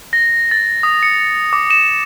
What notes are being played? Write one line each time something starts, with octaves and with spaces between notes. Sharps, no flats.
A#6
A6
D#6
C#7
D6
E7